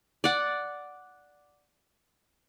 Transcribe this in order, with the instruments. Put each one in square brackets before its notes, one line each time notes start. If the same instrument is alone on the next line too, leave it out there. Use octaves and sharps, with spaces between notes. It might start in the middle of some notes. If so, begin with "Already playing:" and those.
[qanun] D5 F#5